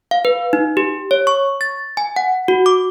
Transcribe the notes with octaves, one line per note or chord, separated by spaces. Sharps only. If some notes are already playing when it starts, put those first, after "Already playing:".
F5
B4
D#4
G4
C#5
C#6
A6
G#5
F#5
F#4
D6